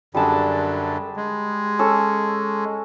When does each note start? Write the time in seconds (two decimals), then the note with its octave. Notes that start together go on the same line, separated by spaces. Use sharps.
0.14 F#2 D3 G3 G#4 A5
1.16 G#3
1.79 C#4 A4 E6